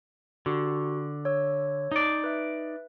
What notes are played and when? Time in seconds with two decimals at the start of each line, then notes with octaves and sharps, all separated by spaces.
0.46 D3 F#4 G4
1.25 C#5 E6
1.92 D#4 D5
2.24 B4 E5